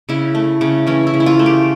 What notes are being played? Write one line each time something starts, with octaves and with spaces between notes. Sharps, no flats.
C#3 E4
A3
C#3
E3 C#4
E4
C#3
E4
F4
A3
G4